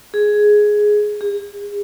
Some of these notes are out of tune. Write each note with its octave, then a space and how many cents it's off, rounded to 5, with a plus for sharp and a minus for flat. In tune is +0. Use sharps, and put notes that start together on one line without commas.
G#4 +10
G#4 -40